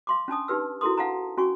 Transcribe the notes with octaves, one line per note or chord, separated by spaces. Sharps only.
F5 C6 D6
C#4 D4 A5 D#6
D#4 G4 B4 E6
E4 F#4 A4 A#4 C6 D#6
D4 F5 F#5 A5 A#5
C#4 F#4 G#5 C#6